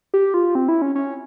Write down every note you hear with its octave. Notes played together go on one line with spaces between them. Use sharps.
G4
F4
C4
E4
C#4
C#4